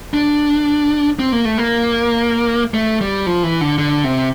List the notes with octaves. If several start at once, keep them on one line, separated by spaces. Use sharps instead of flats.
D4
C4
A#3
A3
A#3
A3
G3
F3
E3
D3
D3
C3